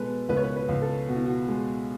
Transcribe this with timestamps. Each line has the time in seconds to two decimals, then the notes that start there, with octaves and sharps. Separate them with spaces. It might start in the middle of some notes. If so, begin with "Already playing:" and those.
Already playing: B2 G#3 A4 B4
0.29 C#2 B4
0.37 C#5
0.44 B4
0.56 B4
0.69 C#2
0.82 A4
1.09 B2 F#4
1.16 E4
1.26 F#4
1.48 G#3